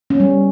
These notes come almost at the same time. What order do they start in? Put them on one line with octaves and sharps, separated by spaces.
C#4 B3 G3